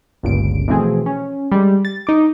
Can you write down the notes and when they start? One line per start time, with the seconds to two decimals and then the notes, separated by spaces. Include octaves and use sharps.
0.23 G1 C#2 A#2 D7
0.68 B2 E3 F3 A3 C4 G#4
1.06 C#4
1.52 G3 G#3
1.85 A6
2.07 D#4 D6